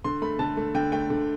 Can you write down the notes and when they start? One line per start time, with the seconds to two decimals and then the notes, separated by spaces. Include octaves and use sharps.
0.04 D3 C6
0.22 A3 B5
0.39 D3 A5
0.57 A3
0.75 D3 G5
0.92 A3 G5
1.10 D3